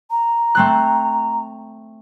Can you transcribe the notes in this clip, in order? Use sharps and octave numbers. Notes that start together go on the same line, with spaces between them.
A#5
A3 C4 F#6